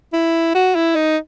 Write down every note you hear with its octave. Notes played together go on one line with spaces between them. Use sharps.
E4
F#4
E4
D#4